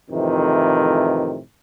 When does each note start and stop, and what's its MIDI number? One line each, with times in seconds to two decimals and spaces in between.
0.11 1.38 41
0.11 1.38 45
0.11 1.38 48
0.11 1.38 51
0.11 1.38 52